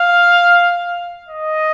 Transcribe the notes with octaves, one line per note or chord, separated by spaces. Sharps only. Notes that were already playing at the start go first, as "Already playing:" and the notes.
Already playing: F5
D#5